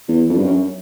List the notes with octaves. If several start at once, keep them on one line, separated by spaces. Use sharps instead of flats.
E2
F2
G2
F#2